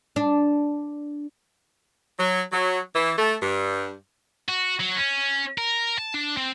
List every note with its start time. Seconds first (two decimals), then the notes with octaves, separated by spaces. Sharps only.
0.16 D4
2.18 F#3
2.52 F#3
2.95 E3
3.18 A3
3.42 G2
4.49 F#4
4.80 F#3
4.97 C#4
5.58 A#4
5.99 A5
6.14 D4
6.37 C4